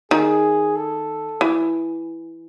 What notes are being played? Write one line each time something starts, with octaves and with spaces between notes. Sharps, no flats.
D#3 G#4
A4
E3